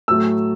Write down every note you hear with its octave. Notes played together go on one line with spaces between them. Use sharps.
A2 F#3 A3 E6